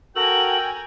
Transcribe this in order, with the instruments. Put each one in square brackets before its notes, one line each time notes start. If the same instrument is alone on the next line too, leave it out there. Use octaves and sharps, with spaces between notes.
[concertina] F#4 A4 [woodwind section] A#4 G5 [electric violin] G#5 A#5 [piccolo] F#7